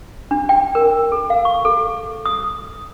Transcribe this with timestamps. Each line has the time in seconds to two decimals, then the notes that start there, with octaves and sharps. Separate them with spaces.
0.31 D4
0.49 G5
0.75 A#4
1.12 A4
1.30 F5
1.45 C#6
1.65 A4
2.25 D#6